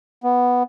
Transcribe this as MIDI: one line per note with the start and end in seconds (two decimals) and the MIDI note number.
0.24 0.63 59